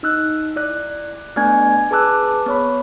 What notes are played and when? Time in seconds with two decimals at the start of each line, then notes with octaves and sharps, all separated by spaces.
0.03 D#4 E6 F#6
0.56 E4 D5 F#6
1.36 A3 B3 D4 D5 G#5 G#6
1.91 G#4 B4 A5 D6 E6 F#6
2.46 B3 C#5 B5